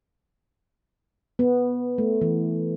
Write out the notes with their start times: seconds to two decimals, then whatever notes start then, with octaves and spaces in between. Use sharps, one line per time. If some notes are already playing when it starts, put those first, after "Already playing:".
1.39 B3
1.98 A3
2.21 E3